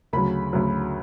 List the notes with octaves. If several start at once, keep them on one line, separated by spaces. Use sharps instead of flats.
D2 C#3 F#3 B5
D2 C#3 F#3